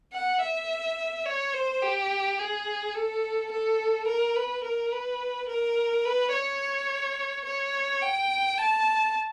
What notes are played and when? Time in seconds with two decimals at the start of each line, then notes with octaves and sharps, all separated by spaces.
0.13 F#5
0.41 E5
1.26 C#5
1.54 C5
1.82 G4
2.39 G#4
2.95 A4
3.51 A4
4.07 A#4
4.36 B4
4.63 A#4
4.92 B4
5.48 A#4
6.05 B4
6.32 C#5
7.45 C#5
8.02 G5
8.58 A5